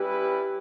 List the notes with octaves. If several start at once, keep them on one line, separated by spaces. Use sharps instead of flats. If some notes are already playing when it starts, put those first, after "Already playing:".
Already playing: G3 C#4 E4 G4 B4